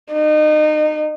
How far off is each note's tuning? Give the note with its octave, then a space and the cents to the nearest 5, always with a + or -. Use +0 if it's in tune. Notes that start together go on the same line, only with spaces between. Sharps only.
D#4 -30